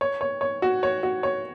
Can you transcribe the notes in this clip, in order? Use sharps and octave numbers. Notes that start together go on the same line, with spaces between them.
C#5
C#5
C#5
F#4
C#5
F#4
C#5